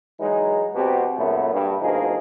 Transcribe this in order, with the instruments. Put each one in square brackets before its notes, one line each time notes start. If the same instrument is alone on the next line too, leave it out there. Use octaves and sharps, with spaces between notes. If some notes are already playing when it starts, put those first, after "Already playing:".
[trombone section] E3 F#3 G#3 D#4
E2 B2 C4 F#4 G4
C#2 F#2 A#2 A3 B3
G2
D2 B2 F3 A#3 D#4 G#4